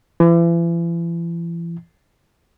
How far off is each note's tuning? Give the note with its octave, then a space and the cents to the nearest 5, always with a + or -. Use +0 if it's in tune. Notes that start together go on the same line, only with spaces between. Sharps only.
E3 +40